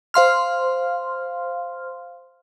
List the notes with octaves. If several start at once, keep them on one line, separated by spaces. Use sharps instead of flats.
C5 F5 C6 F6